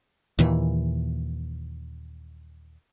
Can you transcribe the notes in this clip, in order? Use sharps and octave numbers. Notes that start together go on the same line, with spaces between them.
D#2 A#2 E3